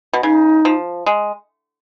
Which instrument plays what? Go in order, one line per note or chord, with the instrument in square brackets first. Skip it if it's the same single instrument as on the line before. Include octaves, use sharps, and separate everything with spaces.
[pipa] B2
[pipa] C#3 [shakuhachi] D#4
[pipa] F3
G#3